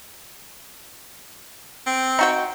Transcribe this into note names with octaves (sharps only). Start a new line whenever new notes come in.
C4
D#4 F#4 G5